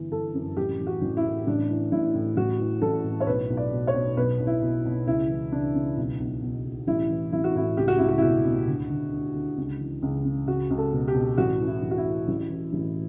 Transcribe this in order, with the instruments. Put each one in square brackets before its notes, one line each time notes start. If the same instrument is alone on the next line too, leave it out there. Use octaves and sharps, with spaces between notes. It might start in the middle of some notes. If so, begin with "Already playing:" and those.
Already playing: [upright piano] G1 E3
G1 A4
F#2
A1 G4
E3
F#4
A1
E4
A2
A1 D4
E3
A1 E4
A2
A1 F#4
E3
A1 A4
A2
C#5
B1 B4
B1
D5
B2
C#5
B2
B1 B4
B1
E4
B2
B2
C#2 E4
E3
C#2 D4
C#3
B1
B1
B2
B2
A1 E4
E3
A1 E4
F#4
A2 E4
C#2 G4
F#4
C#2 E4
F#4
E4
B2 F#4
B2
D2
D2
D3
D3
C#2
E3
C#2
C#3
C#2 F#4
C#2
A4
B2
G4
B2
A1 F#4
E3
E4
A1
F#4
E4
A2
A1
E3
A1